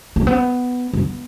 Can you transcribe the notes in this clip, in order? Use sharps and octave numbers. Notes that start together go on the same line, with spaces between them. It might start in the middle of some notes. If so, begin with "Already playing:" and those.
A#3
B3
B3